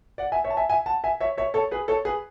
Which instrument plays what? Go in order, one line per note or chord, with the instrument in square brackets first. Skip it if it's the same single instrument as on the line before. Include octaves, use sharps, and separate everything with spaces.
[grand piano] D5 F#5
E5 G#5
C#5 E5
A5
E5 G#5
E5 G#5
F#5 A5
E5 G#5
C#5 E5
C#5 E5
A4 C#5
G#4 B4
A4 C#5
G#4 B4